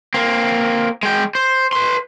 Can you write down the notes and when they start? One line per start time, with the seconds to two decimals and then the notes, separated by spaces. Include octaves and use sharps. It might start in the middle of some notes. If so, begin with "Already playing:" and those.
0.14 A#3 C4
1.03 G#3 G5
1.35 C5
1.73 B4 C6